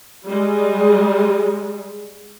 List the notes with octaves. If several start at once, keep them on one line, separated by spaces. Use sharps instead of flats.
G3 G#3